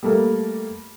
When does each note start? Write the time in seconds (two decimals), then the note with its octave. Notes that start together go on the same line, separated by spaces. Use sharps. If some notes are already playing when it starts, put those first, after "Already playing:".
0.03 G3 A3 A#3 A4 A#4